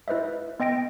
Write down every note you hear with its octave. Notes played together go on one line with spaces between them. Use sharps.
E4 B4 C5 D#5 E5
B3 D#5 G5 A#6 D7